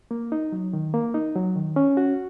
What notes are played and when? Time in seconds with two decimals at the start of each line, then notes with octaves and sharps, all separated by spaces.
0.11 A#3
0.32 D#4
0.52 F#3
0.73 D#3
0.94 A#3
1.14 D#4
1.36 F#3
1.56 D#3
1.76 C#4
1.97 F#4